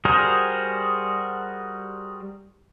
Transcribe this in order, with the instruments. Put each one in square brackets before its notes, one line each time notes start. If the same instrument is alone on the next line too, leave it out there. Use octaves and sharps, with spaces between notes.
[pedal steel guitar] G3 F#4 G#4 A#4 C5